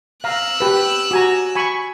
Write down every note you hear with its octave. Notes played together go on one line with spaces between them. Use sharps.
F5 A#5 E6 F#6
G4 B4
F#4 G#5 A#5
G#5 B5 C#6